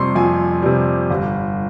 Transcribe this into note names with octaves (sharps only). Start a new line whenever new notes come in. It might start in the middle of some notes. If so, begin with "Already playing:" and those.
Already playing: F2 C3 G3 C6 C#6
F2 G#5
C3 G3
G1